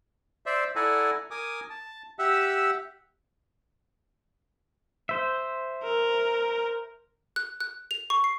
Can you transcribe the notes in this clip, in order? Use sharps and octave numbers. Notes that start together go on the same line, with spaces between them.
C5 D5 E5
E4 A4 D5 F#5 G#5 A#5
A#4 G#5 D6 D#6
A5
G4 E5 F#5 E6
C5 E5
A#4
F#6
F#6
F7
C#6
C7